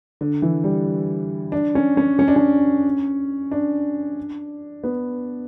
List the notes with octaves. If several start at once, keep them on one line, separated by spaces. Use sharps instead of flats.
D3
E3
G3
D4
C#4
C#4
C#4
D4
C#4
D4
B3